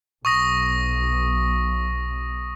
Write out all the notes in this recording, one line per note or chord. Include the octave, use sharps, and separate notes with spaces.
B1 C#6 D#6 A#6